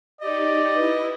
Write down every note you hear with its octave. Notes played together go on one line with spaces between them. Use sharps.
D#4 G4 D5 D#5
E4 B4